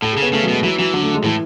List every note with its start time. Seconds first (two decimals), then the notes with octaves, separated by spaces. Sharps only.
0.02 A2 A4
0.13 C#3 G#4
0.22 B3
0.33 C#3 A3
0.43 F#3
0.48 B2 G#3
0.63 E3 F#3
0.78 E3 F#3
0.93 D3 F#3
1.03 A3
1.14 G#3
1.24 A2 E3